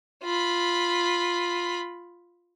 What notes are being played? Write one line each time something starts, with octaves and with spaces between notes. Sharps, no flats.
F4 B5